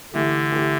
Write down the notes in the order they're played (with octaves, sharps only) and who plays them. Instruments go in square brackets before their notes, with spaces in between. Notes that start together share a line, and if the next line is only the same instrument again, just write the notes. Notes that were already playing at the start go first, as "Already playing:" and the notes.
[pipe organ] D3 [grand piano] E3 A3 E4 G4
[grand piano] E3 A3 E4 G4